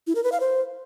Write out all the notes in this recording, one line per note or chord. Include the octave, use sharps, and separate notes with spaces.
E4
A#4
B4
F5
C5